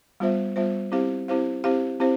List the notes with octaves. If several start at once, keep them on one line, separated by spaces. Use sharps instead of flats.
G3 B3 F4 C5 E5
G3 B3 F4 C5 E5
C4 E4 G4 C5 F5
C4 E4 G4 C5 F5
C4 E4 G4 C5 F5
C4 E4 G4 C5 F5